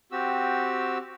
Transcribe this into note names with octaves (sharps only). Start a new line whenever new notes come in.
C4 F#4 G4 E6